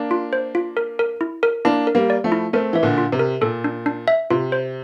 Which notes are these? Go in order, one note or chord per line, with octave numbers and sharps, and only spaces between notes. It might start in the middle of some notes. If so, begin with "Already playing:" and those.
Already playing: A#3 D4
F4
C5
F4
A#4
A#4
E4
A#4
A#3 D4 E4
A#4
G3 A#3
D5
F3 A3
E4
A3 C4 A#4
E3 E5
A#2 D3
F4
C3
A#4
A#2 A4
D4
D4
E5
C3 F4
C5